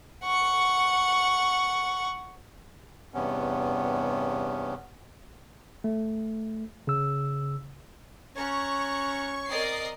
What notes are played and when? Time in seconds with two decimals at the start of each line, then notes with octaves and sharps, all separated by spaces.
0.24 F#5 C#6
3.14 E2 G2 C3 B3 C#4
5.84 A3
6.87 C#3 E6
8.36 C#4 C#5 A#5 C#6 F#6
9.48 C4 A#4 D5 D#5 C7